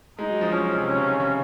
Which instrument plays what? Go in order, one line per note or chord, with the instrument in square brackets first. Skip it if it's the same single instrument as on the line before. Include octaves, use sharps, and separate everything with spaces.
[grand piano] G#3 [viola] D#4
[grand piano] F#3
F3
[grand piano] F3 [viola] C#4
[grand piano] C3
[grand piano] C3 [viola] C#4
[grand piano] C#3
D#3
C#3